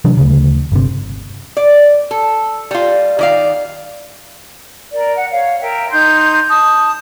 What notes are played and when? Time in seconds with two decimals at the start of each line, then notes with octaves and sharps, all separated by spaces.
0.05 C3 E3 F#3 D4
0.17 D2 C#3
0.72 G1 C3
1.57 D5
2.11 A4
2.71 G3 F4
3.19 D#3 D5 F5
4.92 A#4 D5
5.16 F#5
5.30 C#5 F5
5.60 A#4 E5 G5
5.91 D#4 C6 G6
6.49 A5 D#6